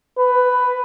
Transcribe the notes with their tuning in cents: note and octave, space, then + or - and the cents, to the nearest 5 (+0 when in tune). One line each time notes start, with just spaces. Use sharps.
B4 +10